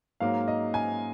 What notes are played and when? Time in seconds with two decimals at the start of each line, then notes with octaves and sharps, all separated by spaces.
0.20 G#2 F#3 A#3 F5
0.48 D#5
0.74 G#5